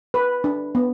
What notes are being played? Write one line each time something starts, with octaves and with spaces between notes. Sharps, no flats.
B4
D4
B3